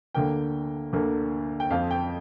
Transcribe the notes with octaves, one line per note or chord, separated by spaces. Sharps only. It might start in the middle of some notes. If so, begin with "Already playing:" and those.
D2 D3 A#3 G5
D2 D3 A#3
G5
F2 F3 C4 F5
G5